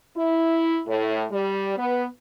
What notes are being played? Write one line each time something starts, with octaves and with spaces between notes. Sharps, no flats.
E4
A2
G3
B3